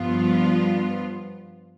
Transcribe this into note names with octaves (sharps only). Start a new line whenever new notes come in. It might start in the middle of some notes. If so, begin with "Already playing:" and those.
Already playing: G2 F3 B3 F4